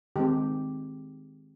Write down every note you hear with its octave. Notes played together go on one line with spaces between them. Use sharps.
D#3 G#3 C4 G4